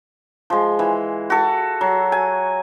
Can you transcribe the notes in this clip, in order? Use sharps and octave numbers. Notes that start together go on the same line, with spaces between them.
F3 G#3
E3
F#4 A4
F#3
G#5